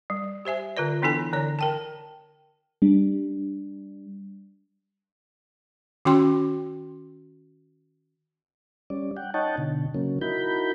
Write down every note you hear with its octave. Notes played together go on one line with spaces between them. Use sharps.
G3
G4 C5 E5 G#5
D3 F4 B4 D5
E3 B3 D4 E4 A4 G#5
D3 C#5 D5
A#4 G5 A5
G3 D4
D#3 C#4 F#4 G5 C6
G3 C#4 D5
F#5 G5
D#4 C#5 D#5 F#5 G5 A5
B2 D3
C#3 F#3 A#3 C#4
D#4 E4 F#4 A#4 B5 G6